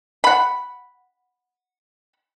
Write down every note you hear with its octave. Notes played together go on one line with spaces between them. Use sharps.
F#5 B5